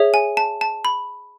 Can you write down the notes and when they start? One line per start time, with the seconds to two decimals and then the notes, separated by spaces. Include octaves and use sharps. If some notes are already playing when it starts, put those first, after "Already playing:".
Already playing: G#4 C#5 E5
0.14 G#5
0.37 A5
0.61 A5
0.85 B5